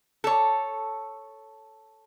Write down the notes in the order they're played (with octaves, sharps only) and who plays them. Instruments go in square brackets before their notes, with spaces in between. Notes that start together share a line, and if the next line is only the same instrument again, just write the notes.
[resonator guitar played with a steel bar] A4 C#5